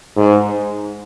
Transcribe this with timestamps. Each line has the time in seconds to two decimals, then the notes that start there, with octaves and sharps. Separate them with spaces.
0.17 G#2